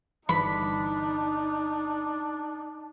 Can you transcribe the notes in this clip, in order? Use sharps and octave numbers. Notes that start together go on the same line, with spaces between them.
G1 E3 D4 D#4 B5